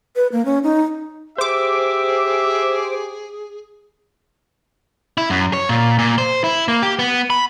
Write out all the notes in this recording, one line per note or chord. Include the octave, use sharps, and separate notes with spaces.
B4
A#3
C#4
D#4
G4 G#4 C5 E5 D6
E4
F#2
C#5
A#2
A#2
C5
E4
A#3
G4
B3
B5